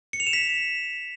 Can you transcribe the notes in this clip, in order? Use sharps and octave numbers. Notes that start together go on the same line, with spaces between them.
C#7
F7
E7
B6